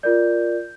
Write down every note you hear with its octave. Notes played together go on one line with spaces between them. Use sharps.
F4 A#4 D5 G6